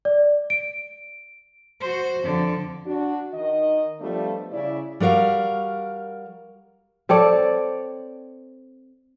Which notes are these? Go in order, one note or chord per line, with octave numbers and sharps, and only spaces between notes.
D5
D7
F#4 C5
F2 D3
D4 F#4
D#3 D#5
F3 G3 A3 B3 D4 F4
C#3 E4 D5
G3 F#4 A#4 F5
C4 A4 C#5 D5